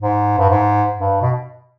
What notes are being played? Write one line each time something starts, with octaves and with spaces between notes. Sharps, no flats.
G#2
G2
G#2
G2
B2